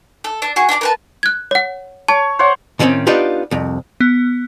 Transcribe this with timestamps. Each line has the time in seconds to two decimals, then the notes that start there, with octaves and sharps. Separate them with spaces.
0.24 A4
0.42 D4 A5
0.56 F#4 G#4 G#5 C#6
0.69 D4 D5 A5 D6
0.81 A#4 B4 A5
1.23 F#6 G#6
1.51 C#5 F#5
2.08 C#5 A5
2.39 C5 C#5 F#5
2.79 A2 D#3 G3 A3 C4 C#4
3.07 B3 D4 D#4 F4 G4 B4
3.51 C2 F2
4.00 B3